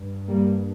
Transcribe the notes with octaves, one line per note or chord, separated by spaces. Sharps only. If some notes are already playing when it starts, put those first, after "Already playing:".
Already playing: G2
G3 A#3